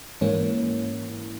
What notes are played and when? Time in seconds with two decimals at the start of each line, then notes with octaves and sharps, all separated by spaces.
0.21 G#2 E3 A#3 C#4